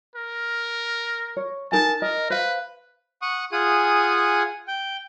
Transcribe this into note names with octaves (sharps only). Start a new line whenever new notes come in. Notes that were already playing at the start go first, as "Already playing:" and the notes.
A#4
C#5
D#4 A#4 G#5 A5
A#4 D#5
B4 C5 F5
F#5 C#6 D#6
F4 G#4 F#5 G#5 D#6
G5